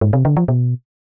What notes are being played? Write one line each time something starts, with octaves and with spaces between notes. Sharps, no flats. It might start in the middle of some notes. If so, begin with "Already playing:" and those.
G#2
C3
D3
F3
B2